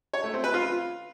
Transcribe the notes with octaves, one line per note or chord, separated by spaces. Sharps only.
C#5
A3
C4
B4
F4